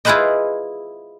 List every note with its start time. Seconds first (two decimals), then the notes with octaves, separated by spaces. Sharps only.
0.05 E4 F4 G#4 B4 C5 D#5